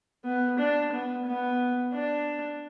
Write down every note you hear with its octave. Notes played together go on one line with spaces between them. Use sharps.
B3
D4
B3
B3
D4